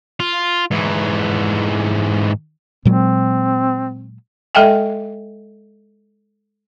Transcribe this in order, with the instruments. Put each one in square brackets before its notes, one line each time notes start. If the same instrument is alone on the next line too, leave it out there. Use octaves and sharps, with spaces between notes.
[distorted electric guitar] F4
G#2 E3
[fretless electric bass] A#2 F#3 G#3 [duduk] C4
[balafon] G#3 A4 D#5 E5 G5 G#5